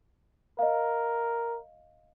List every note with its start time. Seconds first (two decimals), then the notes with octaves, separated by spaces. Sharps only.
0.59 A#4 D#5 F5